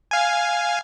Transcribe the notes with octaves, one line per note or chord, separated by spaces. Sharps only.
F5 G#5